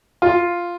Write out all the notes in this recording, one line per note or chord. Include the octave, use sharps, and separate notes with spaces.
F4